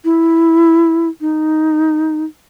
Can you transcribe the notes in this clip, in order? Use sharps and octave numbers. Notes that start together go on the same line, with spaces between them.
E4
D#4